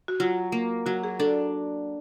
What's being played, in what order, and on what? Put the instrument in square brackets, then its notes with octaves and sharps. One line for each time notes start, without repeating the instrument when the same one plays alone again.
[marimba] F#4
[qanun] F#3 [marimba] F4
[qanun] A#3
[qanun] F#3 [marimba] F#4
[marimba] G#4
[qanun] D4 [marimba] A4